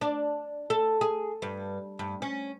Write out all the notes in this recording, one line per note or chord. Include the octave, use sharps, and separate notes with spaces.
D4
A4
G#4
G2
G2
C#4